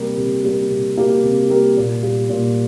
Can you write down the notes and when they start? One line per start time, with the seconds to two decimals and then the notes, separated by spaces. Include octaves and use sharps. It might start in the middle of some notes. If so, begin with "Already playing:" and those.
Already playing: C3 G3 A#3 G4 A#4
0.17 C3
0.44 G3 A#3 G4 A#4
0.70 C3
0.97 G3 A#3 G4 A#4
1.24 C3
1.49 G3 A#3 G4 A#4
1.77 A#2
2.03 G3 A#3
2.30 A#2